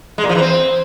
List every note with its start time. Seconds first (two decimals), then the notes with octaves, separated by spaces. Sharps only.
0.18 G#3
0.24 A#2
0.29 F3
0.35 E3
0.41 C4